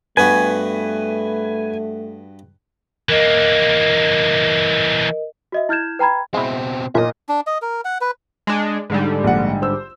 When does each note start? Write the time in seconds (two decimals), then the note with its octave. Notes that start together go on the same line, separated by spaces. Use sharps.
0.17 G2 A3 B3 F#4 B4 G#5
3.09 E3 A#3 A#4 D#5
5.52 F#4 D#5 E5
5.69 E4 F6 G6 G#6 E7
5.99 B4 G5 A#5 B5 G#6
6.34 B2 G#3 C4 E4
6.95 B1 A#2 D#5 E5
7.29 D4
7.47 D#5
7.62 A#4
7.85 F#5
8.01 B4
8.47 G#3 D4
8.90 G#2 D3 G3
9.24 A#1 F#5
9.62 C5 E6